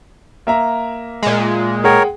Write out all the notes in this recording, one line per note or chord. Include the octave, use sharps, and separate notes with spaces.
A#3 E5 A#5
A#2 G#3
G#4 A#4 C#5 F#5 G5